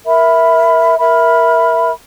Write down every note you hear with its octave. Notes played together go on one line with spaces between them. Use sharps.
A#4 E5 B5
A#4 E5 B5